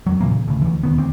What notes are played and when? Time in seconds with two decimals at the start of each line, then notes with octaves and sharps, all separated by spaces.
0.06 F2 F#3
0.21 A#2 C#3 E3 A#3
0.48 D2 C#3
0.62 D2 E3
0.83 E1 D#3 B3
0.98 D2 C4